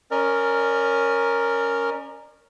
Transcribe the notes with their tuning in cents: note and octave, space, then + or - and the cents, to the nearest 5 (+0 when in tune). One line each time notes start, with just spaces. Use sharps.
C#4 +0 A#4 +0 D5 +35